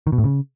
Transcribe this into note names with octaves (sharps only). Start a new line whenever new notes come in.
D#3
B2
A2
C#3